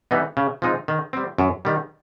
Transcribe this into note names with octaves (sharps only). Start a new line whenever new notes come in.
E3 G3 B3 D#4
C#3
F3 G#3 C4 D#4
D#3
G3 C4
F#2
D#3 G3